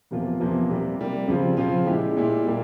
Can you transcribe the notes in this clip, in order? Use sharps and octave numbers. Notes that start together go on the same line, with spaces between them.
E2 C3 F3 A#3 F4
E2 C3 F3 A#3 F4
C3 G3 A#3
C3 G3 A#3
C#3 F3 C4 F4
C#3 F3 C4 F4
A#2 G#3 E4 G4
A#2 G#3 E4 G4
A#2 G3 A#3